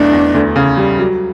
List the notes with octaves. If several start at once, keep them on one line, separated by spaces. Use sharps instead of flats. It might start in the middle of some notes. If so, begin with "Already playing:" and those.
Already playing: B1 E2 A3 D4
E2
D2
C#3
G3
F#3